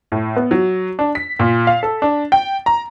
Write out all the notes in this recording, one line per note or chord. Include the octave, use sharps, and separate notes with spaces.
A2
B3
F#3
D4
B6
A#2
F5
A4
D4
G5
A#5